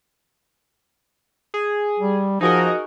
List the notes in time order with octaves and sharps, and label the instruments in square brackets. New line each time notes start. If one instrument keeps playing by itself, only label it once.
[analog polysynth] G#4
[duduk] G3
[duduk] F3 [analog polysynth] D#4 F#4 A#4 [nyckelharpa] G#4 D#5